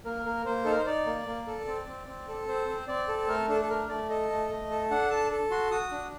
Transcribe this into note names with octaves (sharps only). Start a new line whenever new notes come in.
A#3 A#4
A#3
A#3 C5
D#4 A4
A#4
C5
D#4 D5
A#3
A#3
A4
C4
C4
C4
A4
C4 C5
C4
C4 D5
A4
A3 A#4
D4 A4
A4
A3 A#4
A3 D5
A4 D#5
A3
A3
A4
D4 F#5
A4 A5
A4
F#4 C6
F#4 D#6
D4